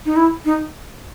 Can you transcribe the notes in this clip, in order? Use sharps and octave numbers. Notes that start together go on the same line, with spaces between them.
D#4
E4
D#4